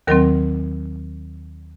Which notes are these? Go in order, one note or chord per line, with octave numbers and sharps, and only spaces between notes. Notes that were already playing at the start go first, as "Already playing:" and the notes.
D#2 D#3 F#3 C4 A#4